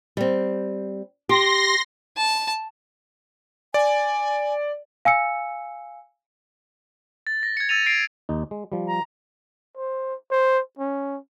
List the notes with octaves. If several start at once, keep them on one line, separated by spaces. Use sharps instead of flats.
G3 C4
G4 C6 A#6
A5
D5 G#5
F5 G#5 E6 C#7
A6
A#6
G#6 C#7
E6 A6 D#7 F7
A#6 C7 D7
D#2 D#4
G#3
F3 G3
A#5
C5
C5
C#4